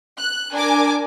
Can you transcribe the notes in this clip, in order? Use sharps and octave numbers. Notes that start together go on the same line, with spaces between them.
F#6
D4 A#4 G#5 D6